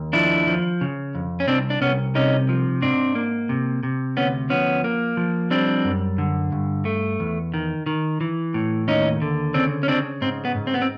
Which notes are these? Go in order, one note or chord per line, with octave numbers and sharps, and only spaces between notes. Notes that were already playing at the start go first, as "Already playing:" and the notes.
Already playing: D#2
F3 D4 E4
F3
C#3
F2
C#4
C2 C4 D4
D4
C2 B3 C#4
C3 C#4 D#4
F3
G#2 C4 D4
A#3
C3
C3
D2 B3 C#4
F3 B3 C#4
A#3
F3
G3 C4 D4
F#2
D3
G2
A3
E2
D#3
D#3
E3
A2
D#2 C#4 D#4
D3
C#3 C4 D4
C#4
C#3 C4 D4
G#2 C4
B3
G#2
C4
B3
C4